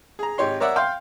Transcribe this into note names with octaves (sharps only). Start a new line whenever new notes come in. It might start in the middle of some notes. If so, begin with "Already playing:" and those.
G#4 A#5
G#1 G4 C#5 C6
A#4 C#5 D5 E5 F#5
F5 G5 C6